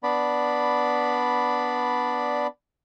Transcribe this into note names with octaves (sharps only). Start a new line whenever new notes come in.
B3 D4 D5 B5